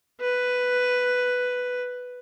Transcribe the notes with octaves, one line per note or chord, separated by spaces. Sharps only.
B4